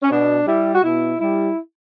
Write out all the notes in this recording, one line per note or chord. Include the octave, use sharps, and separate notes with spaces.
C#4
B2 D4
G3 E4
F#4
B2 E4
G3 E4